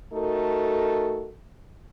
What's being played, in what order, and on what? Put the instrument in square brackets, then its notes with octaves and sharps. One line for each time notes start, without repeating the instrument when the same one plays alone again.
[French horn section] A3 D#4 F#4 A4 A#4